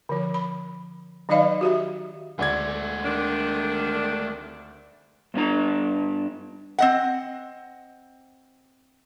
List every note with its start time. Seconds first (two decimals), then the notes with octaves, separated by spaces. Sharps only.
0.09 D3 F3
0.34 B5
1.29 D#3 F#3 D#4 D5 D#5 F5
1.61 F#4 G4 E5
2.39 D2 G#3 A3 D5 G#6
3.05 C3 D#3 D4
5.34 G2 B3 D4 A#5
6.79 C4 D#5 F#5